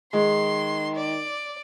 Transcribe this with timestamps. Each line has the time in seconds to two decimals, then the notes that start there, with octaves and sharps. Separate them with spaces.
0.13 D#3 G#3 C6
0.97 D5